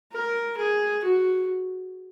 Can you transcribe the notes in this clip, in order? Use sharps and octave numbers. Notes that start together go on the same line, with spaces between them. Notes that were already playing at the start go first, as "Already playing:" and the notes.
A#4
G#4
F#4